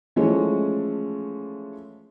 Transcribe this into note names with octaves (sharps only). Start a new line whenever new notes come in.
E3 F3 G#3 A3 C#4